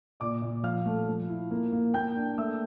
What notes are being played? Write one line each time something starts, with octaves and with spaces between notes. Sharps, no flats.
A#2 D5 D6
A#2
F3 F5 F6
A3
F3
E4
A#3
A#3
A#3 G5 G6
D4
A3 E5 E6